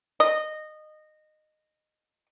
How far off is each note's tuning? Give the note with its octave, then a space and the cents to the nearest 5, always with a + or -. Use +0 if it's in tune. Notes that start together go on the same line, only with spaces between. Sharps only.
D#5 -15